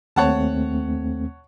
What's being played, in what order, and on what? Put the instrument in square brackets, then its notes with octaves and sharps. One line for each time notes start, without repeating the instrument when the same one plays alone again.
[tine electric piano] D#2 A3 C4 [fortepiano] C#5 F#5 A5